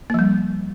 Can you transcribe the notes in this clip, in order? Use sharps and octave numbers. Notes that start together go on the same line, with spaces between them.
F3 G3 A#3